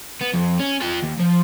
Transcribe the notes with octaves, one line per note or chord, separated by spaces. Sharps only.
B3
F2
C#4
F4 G5
D#2
F3